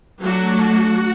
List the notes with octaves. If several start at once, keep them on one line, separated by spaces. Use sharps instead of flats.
F#3 A3 D4 F#4
F#4